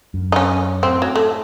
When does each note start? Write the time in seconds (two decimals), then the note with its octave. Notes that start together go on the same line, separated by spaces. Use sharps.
0.14 F#2
0.32 D#4
0.36 C#4
0.83 A2 C4
1.02 F#3
1.16 A3